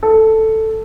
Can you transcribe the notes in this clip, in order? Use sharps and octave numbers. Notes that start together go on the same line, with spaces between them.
A4